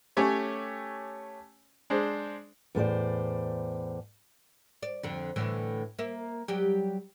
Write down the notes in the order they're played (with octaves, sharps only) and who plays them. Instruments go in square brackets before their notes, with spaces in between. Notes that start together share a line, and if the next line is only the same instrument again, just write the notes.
[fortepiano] A3 C#4 G4 C#5 G#5
G#3 D4 C5
[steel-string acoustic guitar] E2 A2 C5 D5
[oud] D5
F2 D3
A2 D3 E3
A#3 E5
F#3 G3 G4